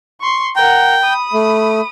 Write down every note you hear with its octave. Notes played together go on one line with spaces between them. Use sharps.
C6 C#6
A#4 F#5 G5
B5 D#6
A3